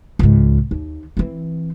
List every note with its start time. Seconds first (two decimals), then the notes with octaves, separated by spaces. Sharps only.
0.19 C#2 G#2
0.71 D#2
1.17 E3 C4